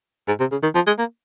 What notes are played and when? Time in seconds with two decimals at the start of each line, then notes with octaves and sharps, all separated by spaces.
0.28 G#2
0.40 C3
0.51 C#3
0.63 D#3
0.75 F3
0.87 G#3
0.98 A#3